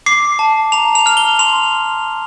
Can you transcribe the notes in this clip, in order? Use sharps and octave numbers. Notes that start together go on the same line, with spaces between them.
D6 C7
A5
A#5 F7
F7
F6 F7
G7
C6 F7